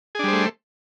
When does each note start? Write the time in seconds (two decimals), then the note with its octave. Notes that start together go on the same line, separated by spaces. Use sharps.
0.15 G#4
0.19 D4
0.24 G3
0.28 C5
0.33 A3